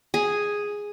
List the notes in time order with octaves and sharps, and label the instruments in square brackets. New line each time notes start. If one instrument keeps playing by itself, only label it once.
[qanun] G#4